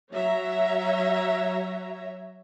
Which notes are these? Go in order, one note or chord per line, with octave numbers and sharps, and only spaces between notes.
F#3 C#5 E5 A#5